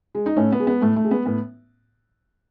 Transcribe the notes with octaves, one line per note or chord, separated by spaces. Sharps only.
G#3
D#4
A2 A3 C#4
B3
G#3
B3
A2 A3
A3
G#3
B3
A2 B3